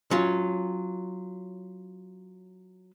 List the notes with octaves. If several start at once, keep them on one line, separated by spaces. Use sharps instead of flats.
F#3 C#4 F4